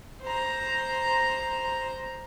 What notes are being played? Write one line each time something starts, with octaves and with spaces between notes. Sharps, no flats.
C5 A#5